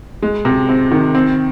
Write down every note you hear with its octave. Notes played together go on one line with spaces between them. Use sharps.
G#3
C3
C4
D#3
C4